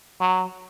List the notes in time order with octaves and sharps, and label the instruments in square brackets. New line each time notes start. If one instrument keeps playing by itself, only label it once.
[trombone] F#3